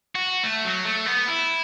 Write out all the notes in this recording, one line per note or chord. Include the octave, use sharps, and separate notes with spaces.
F#4
A3
F#3
A3
B3
E4